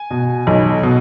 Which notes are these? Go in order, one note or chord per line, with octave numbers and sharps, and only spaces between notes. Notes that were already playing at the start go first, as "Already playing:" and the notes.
Already playing: G#5
B2
B1
B2